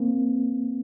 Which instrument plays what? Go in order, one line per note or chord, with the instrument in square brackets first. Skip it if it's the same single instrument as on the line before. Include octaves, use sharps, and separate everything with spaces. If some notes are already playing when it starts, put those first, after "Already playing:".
Already playing: [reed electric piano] A#3 C4